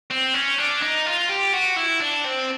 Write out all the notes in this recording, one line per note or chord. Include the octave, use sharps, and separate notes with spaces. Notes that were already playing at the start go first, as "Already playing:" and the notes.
C4
C#4
D4
D#4
F4
G4
F#4
E4
D4
C4